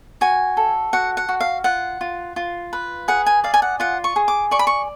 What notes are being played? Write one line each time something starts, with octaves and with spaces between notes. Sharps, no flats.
F#4 G#5
A4
F#4 F#5
F#5
F#4
F5
F4 F#5
F4
F4
B4
G#4 F#5
G#5
D5 F5
G#5
F#5
F4 F#5
C#6
G#4
D6
D5 C#6
B5
C#6